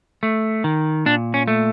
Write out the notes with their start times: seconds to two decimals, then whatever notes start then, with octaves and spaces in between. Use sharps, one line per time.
0.23 A3
0.64 D#3
1.06 A#2 D4
1.34 C#4
1.48 A3